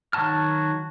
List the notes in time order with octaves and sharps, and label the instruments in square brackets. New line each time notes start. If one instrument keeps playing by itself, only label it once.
[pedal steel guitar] D#3 F#3 F#4 A5 F6